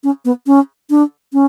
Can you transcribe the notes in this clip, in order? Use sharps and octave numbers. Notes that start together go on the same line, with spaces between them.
C#4
B3
C#4
D4
C#4